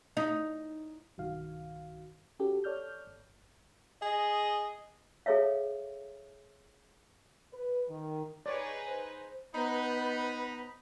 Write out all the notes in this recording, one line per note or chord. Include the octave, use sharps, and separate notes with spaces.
D#4
B1 G2 D#3 F#4 F5
C#4 F#4 G4 A4
A4 C#5 D5 F6 G6
G1
G#4 D#5
G#4 A4 C#5 E5 F5
B4
D#3
D#4 G#4 B4 C#5 D5
C5
B3 D#4 B4 C5 B5